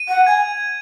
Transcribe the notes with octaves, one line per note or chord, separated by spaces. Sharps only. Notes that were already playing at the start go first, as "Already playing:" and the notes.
Already playing: D#7
F#5
G#5 G#6